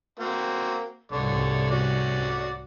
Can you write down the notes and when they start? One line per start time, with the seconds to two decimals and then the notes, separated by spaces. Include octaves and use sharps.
0.20 A#3 C4 F#4
1.12 C2 G#2 D3 C#5 D5
1.71 C#4 F#4 D5